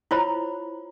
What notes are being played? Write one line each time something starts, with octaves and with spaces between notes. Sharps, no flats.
E4 F4 C5 C#5 A#5 B5